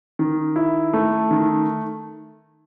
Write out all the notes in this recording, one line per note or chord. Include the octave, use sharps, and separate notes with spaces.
D#3
E4
A3
D#3